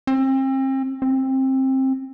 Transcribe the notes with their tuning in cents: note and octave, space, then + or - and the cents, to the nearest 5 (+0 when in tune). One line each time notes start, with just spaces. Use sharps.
C4 +35
C4 +20